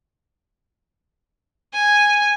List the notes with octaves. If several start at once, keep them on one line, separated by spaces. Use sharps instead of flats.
G#5